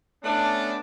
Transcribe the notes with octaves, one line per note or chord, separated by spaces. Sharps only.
A3 B3 C#4 D4